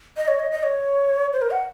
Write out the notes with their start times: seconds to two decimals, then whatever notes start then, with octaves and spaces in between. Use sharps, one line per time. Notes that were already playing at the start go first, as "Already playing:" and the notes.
0.17 D#5
0.28 C#5
0.39 D#5
0.52 D#5
0.63 C#5
1.33 C5
1.42 A#4
1.51 F#5